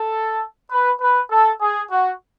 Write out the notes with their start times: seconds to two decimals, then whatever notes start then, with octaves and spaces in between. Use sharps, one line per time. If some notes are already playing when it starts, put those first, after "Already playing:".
Already playing: A4
0.71 B4
1.01 B4
1.30 A4
1.61 G#4
1.91 F#4